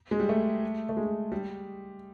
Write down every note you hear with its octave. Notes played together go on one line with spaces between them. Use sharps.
G#3
G3
A3
A3
G#3
G3